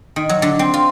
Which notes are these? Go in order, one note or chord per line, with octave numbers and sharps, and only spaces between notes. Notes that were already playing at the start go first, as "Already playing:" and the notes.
D#3
F#3
D3
C4
F4